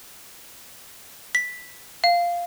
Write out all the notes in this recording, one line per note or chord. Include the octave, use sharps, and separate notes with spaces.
B6
F5